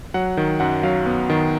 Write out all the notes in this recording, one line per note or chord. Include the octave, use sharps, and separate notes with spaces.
F#3 F#5
D#3
F#2 F#5
F#3 F5
B3
D#3